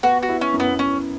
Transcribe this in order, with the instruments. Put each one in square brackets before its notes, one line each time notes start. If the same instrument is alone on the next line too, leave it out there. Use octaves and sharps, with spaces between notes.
[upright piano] B3 [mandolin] F#4
[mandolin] F#4
[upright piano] E4
[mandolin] C#4
[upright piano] F#2
[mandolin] B3
[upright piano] F#2 [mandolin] C#4